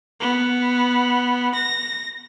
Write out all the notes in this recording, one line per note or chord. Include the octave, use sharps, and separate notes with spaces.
B3
A#6